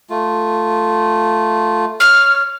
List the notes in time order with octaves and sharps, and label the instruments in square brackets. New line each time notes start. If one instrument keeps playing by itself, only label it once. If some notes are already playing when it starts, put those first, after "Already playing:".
[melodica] A3 F4
[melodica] C#5 [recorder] F6